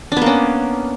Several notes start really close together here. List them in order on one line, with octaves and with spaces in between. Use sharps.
D4 B3 A#3 C#4